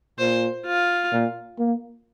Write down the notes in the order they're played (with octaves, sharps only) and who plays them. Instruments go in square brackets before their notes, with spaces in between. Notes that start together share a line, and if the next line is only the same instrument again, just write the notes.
[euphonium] A#2 [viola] C5
[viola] F4
[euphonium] A#2
A#3